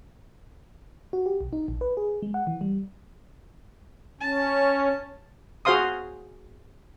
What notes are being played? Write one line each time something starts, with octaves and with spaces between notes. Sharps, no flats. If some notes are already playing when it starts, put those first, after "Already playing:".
F#4
G4
B1
D#4
A#1
B4
G#4
G#3
F#5
E3
G3
C#4 A5
F#4 G#4 C5 F5 C6 D#6